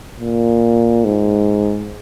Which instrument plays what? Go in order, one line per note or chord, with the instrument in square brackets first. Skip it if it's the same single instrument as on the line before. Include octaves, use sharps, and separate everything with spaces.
[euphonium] A#2
G#2